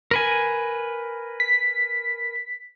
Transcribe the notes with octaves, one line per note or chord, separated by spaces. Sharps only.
A#4 B4 G#5
B6